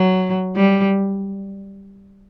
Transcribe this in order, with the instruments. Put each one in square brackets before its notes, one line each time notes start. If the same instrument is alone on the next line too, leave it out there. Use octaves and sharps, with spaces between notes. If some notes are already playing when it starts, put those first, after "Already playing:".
Already playing: [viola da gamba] F#3
G3